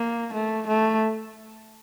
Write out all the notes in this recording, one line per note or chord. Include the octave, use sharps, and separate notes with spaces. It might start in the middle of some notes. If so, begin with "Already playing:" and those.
Already playing: A#3
A3
A3